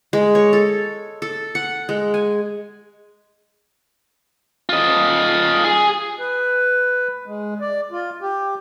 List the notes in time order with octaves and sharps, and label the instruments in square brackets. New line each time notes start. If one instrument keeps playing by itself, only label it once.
[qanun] G#3
C#5
A4
A4
F#5
G#3
G#5
[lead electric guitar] F4 D#5
G#4
[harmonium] B4
G#3
D5
F4
G4